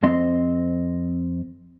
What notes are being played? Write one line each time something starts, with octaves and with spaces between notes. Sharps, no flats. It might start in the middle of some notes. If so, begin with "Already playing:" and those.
F2 C4 D#5 C6